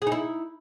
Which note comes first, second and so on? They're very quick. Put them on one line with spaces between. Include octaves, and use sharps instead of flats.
G#4 D#4 E4